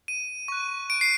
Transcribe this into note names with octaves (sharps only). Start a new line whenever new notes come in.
D#7
C#6 F#6
D7
C7